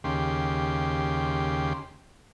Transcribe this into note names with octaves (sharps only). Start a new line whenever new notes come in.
D#2 C#3 G4 C6